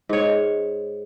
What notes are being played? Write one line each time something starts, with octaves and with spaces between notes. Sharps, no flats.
G#2 C#5